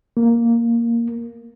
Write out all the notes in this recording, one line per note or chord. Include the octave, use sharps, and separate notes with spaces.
A#3